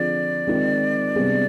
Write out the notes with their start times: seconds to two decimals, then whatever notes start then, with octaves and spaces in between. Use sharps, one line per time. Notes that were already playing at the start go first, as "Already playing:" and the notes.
Already playing: D3 F3 C4 F4 G#4 D5
0.47 D#3 G#3 C4 F4
1.16 C3 G3 B3 D4 G#4